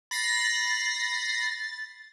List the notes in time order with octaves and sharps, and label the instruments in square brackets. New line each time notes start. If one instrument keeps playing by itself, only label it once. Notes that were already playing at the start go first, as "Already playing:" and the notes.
[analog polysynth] B5 A#6 C7 [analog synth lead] A6